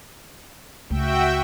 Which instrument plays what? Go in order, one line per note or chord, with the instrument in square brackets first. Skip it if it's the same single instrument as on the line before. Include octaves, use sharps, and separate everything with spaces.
[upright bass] C#2 A3 [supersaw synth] F#4 E5 G5